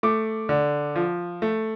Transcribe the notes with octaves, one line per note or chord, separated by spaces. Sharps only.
A3 D6
D3
F3
A3